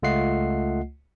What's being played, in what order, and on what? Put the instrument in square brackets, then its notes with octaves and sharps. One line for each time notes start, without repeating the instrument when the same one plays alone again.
[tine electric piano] C#2 A3 F4 D#5 F#5 C7